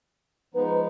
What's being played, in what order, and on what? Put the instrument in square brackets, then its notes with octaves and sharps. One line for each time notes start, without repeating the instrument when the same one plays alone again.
[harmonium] F3 G#3 B3 D#4 [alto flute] B4